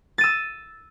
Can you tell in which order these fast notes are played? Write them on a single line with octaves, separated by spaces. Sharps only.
A6 D#7 E6